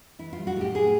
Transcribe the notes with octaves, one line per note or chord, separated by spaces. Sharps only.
E3 E4
F4
G3
F#4
A2 G4
A2 G#4